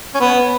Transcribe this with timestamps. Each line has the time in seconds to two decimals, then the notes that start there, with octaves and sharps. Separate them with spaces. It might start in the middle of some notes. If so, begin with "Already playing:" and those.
0.14 C#4
0.20 B3